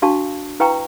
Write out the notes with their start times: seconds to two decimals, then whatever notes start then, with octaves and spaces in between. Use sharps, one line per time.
0.02 D4 F#4 F5 A5 C#6
0.60 E4 B4 F5 G5 A#5 C#6